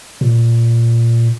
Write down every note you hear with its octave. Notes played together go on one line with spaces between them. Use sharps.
A#2